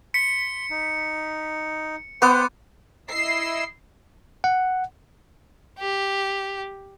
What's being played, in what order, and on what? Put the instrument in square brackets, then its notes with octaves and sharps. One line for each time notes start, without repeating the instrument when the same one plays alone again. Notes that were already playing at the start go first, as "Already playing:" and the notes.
[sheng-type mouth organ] C6 [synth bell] B6 [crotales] C#7
[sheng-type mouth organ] D#4
[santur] B3 [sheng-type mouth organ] C5 F#5 G5 [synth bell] C6 D6 F#6
[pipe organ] E4 D#5 E6 [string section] C7
[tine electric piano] F#5
[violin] G4